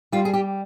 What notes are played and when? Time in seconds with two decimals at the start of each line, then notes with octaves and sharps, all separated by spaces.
0.12 G3 F4
0.25 G#4
0.33 G4